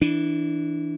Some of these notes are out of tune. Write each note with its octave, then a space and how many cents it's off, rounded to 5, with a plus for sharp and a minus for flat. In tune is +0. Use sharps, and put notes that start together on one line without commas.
E3 -15 D4 +0